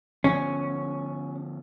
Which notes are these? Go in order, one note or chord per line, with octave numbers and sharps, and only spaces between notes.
D3 F3 B3 C#4